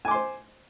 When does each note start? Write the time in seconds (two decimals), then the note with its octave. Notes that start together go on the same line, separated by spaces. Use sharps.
0.05 G#5
0.08 D6
0.11 C6
0.14 C5